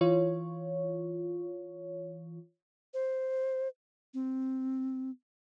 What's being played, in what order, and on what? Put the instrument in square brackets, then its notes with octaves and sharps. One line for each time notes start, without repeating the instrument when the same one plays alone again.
[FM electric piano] E3 F4 C#5
[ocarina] C5
C4